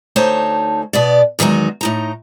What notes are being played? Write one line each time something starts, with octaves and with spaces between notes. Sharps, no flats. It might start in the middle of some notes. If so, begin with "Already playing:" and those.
D2 A3 D#4 C5 C#5 A5
B2 B3 D5
E2 D#3 F#3 G#3 D#4
A2 D#4 A#5